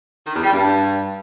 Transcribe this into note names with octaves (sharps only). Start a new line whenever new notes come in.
D#3
E2
G3
G2